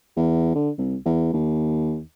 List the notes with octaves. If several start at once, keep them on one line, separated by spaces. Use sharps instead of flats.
E2
D3
C2
E2
D#2